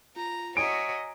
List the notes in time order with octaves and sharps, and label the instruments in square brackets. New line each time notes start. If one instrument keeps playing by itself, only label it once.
[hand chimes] F4 [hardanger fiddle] A#5
[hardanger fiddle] F#4 C#5 [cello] D#5 E5 [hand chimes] G#5 A#5 [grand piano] D7